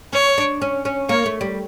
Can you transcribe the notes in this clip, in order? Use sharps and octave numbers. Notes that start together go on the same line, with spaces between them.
C#4 C#5
D4
C#4
C#4
A#3 C#5
A3
G3